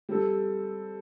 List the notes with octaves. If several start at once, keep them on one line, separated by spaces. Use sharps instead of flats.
G3 C4 A4